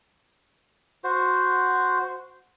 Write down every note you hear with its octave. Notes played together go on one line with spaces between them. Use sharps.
F#4 C5